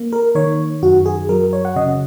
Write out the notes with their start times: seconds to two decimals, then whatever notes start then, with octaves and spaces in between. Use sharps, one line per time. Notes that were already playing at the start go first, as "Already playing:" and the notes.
Already playing: A#3
0.13 A#4
0.35 D#3 C#5
0.82 F#2 F#4
1.06 G#4
1.29 F#3 A#4
1.53 C#5
1.65 F#5
1.76 C#3 D#5